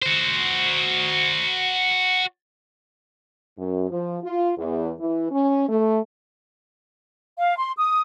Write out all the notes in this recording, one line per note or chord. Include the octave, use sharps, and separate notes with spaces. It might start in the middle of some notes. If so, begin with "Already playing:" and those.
F#4 C5
F#2
F3
F4
E2
E3
C#4
A3
F5
C6
D#6